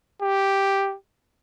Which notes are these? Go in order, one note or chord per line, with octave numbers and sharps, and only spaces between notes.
G4